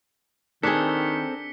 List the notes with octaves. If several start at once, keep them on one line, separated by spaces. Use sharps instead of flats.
D#3 C4 D4 G#4 A4 B6 C#7 G7